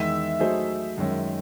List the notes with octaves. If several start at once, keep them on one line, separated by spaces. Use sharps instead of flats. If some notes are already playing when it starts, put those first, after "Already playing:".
Already playing: E2 D#3 G#3 D#4 E5
F#3 A3 D#4 G#4 C5
F#2 D#3 G#3 C#4